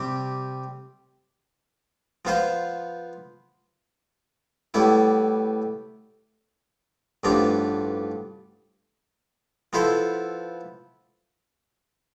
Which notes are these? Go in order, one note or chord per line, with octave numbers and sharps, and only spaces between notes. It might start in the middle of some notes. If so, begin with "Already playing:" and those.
Already playing: C3 G3 C4 G4
F3 B3 F4 C5
A2 G3 B3 E4
A1 G2 F3 B3 D4
F3 B3 E4 A4 C5